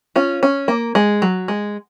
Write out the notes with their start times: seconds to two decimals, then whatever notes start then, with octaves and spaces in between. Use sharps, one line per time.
0.16 C#4 F4
0.43 C#4
0.68 A#3
0.95 G#3
1.22 F#3
1.48 G#3